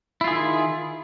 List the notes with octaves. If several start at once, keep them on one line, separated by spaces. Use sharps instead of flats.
D#3 E4 F4 G#4